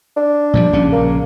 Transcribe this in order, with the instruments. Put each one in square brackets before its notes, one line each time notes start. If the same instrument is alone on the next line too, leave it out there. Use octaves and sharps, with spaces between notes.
[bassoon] D4
[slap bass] A#2 F3 G3
A#1 C#3 C#4
[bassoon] A#3